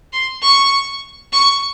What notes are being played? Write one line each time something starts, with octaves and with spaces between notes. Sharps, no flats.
C6
C#6
C#6